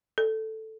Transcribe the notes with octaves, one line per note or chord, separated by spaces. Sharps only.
A4